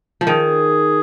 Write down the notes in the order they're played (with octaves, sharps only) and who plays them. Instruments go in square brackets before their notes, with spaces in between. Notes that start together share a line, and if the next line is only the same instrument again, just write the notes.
[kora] F3
[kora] D#3 [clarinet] G#4